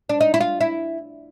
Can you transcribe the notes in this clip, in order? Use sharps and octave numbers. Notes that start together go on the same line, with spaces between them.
D4
D#4
E4
F4
E4